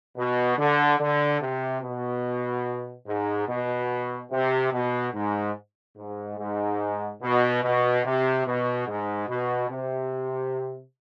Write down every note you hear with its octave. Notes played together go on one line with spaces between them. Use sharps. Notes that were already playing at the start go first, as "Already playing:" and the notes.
B2
D3
D3
C3
B2
G#2
B2
C3
B2
G#2
G#2
G#2
B2
B2
C3
B2
G#2
B2
C3